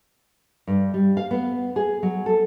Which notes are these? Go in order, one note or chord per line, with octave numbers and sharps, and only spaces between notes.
G2
G3
F5
B3
G#4
F#3
A4